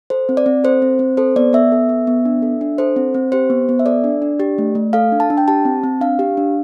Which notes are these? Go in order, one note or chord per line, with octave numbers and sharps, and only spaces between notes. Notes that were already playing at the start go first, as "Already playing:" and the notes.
A4 C5
C4
D5
C4
A4 C5
C4
C4
A4 C5
B3 D5
B3 E5
A4
B3
B3
D4
A4
D4
A4 C5
C4
C4
G4 C5
B3
B3
E5
A4 D5
D4
D4
G4
A3
A3
A4 F5
D4
A5
D4
G5
G4 A5
C4
C4
D4 F5
G4
D4